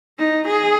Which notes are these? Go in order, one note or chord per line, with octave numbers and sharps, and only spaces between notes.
D#4
G#4